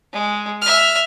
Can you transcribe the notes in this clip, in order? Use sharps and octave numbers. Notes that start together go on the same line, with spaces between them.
G#3
E5 F6